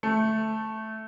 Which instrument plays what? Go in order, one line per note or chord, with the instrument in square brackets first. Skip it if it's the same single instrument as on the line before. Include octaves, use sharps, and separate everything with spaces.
[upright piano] A3